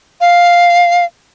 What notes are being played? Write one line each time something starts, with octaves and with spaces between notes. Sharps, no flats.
F5